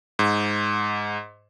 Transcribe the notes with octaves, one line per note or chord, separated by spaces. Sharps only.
G#2